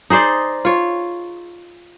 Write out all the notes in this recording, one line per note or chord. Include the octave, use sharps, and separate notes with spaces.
D#4 G#4 C5 D5
F4 C#5